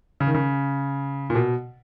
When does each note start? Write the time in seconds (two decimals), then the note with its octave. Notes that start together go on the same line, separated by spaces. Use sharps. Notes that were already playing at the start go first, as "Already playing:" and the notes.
0.20 C#3
0.27 D#3
0.34 C#3
1.30 A#2
1.35 B2